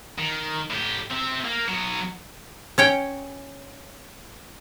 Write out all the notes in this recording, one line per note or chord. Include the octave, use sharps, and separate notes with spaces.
D#3
A2 G4
C4 E5
A#3
F#3 B3
C#4 C#5 G5